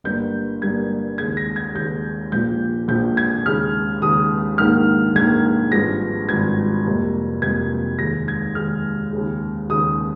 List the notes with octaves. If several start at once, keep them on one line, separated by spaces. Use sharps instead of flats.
G1 G2 G3 A#3 G6
G1 G2 G3 A#3 G#6
D#2 C#3 G#3 G#6
A#6
G#6
D#2 C#3 G#3 G6
A#1 A#2 F3 G6
A#1 A#2 F3 G6
G#6
D#2 C#3 G#3 F6
D#2 C#3 G#3 D#6
A#1 G#2 D#3 A#3 F6
A#1 G#2 D#3 A#3 G#6
G#1 G2 F3 G#3 A#6
G#1 G2 F3 G#3 G#6
F2 C3 G3 A#3
F2 C3 G3 A#3 G#6
D#2 D#3 G#3 A#6
G#6
D#2 D#3 G#3 F6
D#2 C#3 G#3
D#2 C#3 G#3 D#6